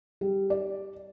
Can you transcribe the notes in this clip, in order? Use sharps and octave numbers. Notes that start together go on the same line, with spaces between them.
G3
D5